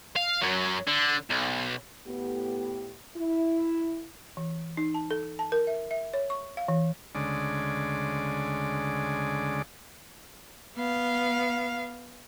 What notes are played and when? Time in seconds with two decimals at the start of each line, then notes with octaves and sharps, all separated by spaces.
0.16 F5
0.41 F#2 F#3
0.87 D3
1.30 B1
2.07 A2 B3 G4
3.17 E4
4.37 E3
4.77 D#4
4.94 A5
5.11 A4
5.39 A5
5.52 A#4
5.67 E5
5.91 E5
6.14 C#5
6.30 C#6
6.57 F5
6.68 E3
7.15 D2 C#3 G#3 D5
10.77 B3 F5